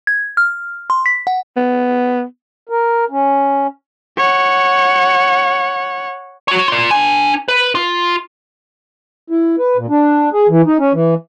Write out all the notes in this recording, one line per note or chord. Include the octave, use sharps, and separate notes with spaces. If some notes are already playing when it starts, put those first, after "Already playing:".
G#6
F6
C6
B6
F#5
B3
A#4
C#4
C#5 F#5
F#4 C#5
F4 D5
D4 G#5
B4
F4
E4
B4
A#2
D4
G#4
E3
D#4
C#4
E3